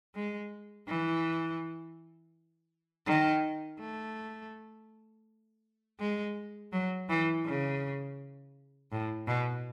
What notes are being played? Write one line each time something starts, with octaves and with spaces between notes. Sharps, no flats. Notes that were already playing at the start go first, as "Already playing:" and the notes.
G#3
E3
D#3
A3
G#3
F#3
E3
C#3
A2
B2